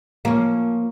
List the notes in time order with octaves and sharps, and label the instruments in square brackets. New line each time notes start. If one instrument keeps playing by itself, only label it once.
[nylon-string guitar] F3 [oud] A#3 C#4